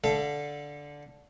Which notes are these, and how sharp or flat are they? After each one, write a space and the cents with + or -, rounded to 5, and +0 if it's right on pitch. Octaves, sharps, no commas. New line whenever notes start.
D3 -10 A4 -10 F5 -45